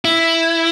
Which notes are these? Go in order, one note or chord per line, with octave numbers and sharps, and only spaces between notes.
E4